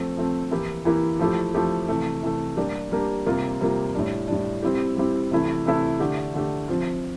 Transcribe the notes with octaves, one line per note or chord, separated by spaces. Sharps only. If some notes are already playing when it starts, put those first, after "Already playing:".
Already playing: F3 A3 C4
F3 A3 C4
E3 A#3 E4 G4
E3 A#3 E4 G4
F3 A3 E4 G4
F3 A3 E4 G4
C3 E3 A3
C3 E3 A3
G3 A#3 D4 G4
G3 A#3 D4 G4
C3 G3 A#3 F4
C3 G3 A#3 F4
A2 G3 D4
A2 G3 D4
G3 C4 E4 G4
G3 C4 E4 G4
C3 E3 A3 E4
C3 E3 A3 E4
D3 A3 D4 G4
D3 A3 D4 G4
F3 C4 F4